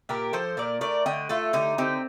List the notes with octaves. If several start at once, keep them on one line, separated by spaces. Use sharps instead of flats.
A#2 G4 A#4
F3 A4 C5
A#2 A#4 D5
A3 A#4 D5
D3 D#5 G5
A3 F4 A4
D3 D#4 G4
C4 D#4 G4